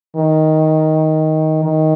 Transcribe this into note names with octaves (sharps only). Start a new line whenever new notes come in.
D#3
D#3